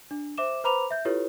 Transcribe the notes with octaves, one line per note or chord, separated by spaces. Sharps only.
D4
C5 E5 D6 E7
B4 C5 A#5 B5 D6 F7
E5 G6
E4 F4 G4 A4 B4 C#5